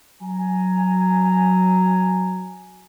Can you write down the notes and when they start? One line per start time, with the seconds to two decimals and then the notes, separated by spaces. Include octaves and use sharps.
0.21 F#3 G#5 A#5